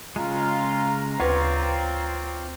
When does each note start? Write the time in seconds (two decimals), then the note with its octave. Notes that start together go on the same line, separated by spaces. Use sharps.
0.16 C#3 G#3 F4 A#5
1.20 D2 C4 F4 B4 C#5 D5